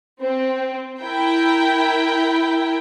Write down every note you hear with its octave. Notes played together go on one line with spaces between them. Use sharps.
C4
E4 A#4 G5